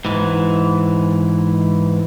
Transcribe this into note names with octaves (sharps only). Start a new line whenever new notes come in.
G#2 E3